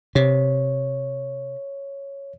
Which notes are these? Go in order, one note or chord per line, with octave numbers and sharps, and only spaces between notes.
C3 C#5